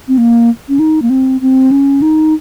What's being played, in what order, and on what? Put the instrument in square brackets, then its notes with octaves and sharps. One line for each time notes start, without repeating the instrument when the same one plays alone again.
[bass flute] C4
A#3
C#4
D#4
A#3
C4
C4
C#4
D#4